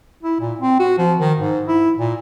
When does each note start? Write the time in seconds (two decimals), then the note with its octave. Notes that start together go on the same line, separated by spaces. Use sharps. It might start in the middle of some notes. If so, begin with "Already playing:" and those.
0.23 E4
0.40 A#2
0.60 C4
0.79 F#4
0.98 F3
1.19 D#3
1.39 G#2
1.68 E4
1.97 A#2